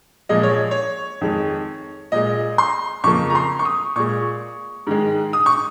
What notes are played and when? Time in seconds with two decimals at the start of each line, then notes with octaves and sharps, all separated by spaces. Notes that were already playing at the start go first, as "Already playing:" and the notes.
0.29 A#2 F3 G#3 D#5
0.43 C#5
0.71 C#5
1.21 F2 D#3 G#3
2.12 A#2 G#3 D#5
2.58 C6
3.04 F2 C#3 F3 A#3 C#6
3.30 A#5
3.35 C6
3.59 C#6
3.65 D#6
3.96 A#2 G#3 C#6
4.87 G#2 D#3 G#3
5.33 D#6
5.46 C#6